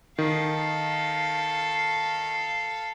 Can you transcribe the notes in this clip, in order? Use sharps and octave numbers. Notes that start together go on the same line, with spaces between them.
D#3 A4 F5